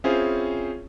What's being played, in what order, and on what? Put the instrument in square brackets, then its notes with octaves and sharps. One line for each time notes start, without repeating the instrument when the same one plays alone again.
[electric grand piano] C4 C#4 E4 F4 G#4 C5